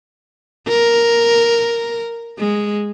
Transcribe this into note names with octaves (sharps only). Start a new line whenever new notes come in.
A#4
G#3